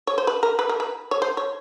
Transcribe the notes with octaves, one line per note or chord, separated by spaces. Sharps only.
C#5
C5
B4
A#4
B4
A#4
B4
C#5
C5
C#5